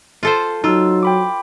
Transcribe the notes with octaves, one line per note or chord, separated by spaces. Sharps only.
F4 A4 C5
F#3 D#4 F4 E6
G5 B5 D6